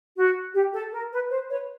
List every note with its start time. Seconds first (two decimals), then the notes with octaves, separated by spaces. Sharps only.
0.18 F#4
0.55 G4
0.74 A4
0.93 A#4
1.12 B4
1.31 C5
1.49 B4 C#5